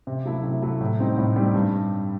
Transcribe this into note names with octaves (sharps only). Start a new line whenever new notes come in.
C3
F#3 A3 E4
C3
F#3 A3 E4
A2
G3 C4 D#4
A2
G3 C4 D#4
G2